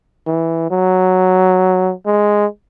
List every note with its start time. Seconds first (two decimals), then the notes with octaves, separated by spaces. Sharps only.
0.27 E3
0.71 F#3
2.06 G#3